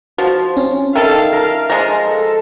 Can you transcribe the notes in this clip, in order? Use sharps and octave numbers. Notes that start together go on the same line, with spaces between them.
F3 F#4 C5
C4 C#4
D#3 A4 E5 F5
A#4
F3 G#3 A#5
A4